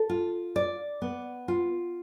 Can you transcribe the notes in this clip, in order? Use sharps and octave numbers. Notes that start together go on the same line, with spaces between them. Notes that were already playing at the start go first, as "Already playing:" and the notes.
Already playing: A4
F4
D5
B3
F4